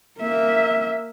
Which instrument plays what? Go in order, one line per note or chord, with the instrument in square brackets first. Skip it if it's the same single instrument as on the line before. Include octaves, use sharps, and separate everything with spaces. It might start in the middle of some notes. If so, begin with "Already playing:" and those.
[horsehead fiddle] A#3 E5